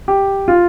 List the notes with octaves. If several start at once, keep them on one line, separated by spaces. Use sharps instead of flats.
G4
F4